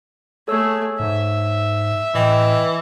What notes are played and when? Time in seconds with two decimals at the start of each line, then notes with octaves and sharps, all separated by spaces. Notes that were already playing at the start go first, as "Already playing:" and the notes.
0.48 A3 G#4 A4 C#5 E6
1.00 G#2 E5
2.15 A2 E3 D#5 G5